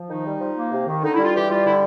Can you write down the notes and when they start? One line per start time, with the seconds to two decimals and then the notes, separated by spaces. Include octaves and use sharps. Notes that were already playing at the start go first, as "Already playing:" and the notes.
Already playing: F3
0.09 D#3 D#4
0.25 G3
0.40 F3
0.56 A#3
0.71 C3
0.86 D#3
1.03 D3 D#4
1.13 E4
1.18 G3 F4
1.34 E3 G4
1.49 G3 F4
1.65 D3 E4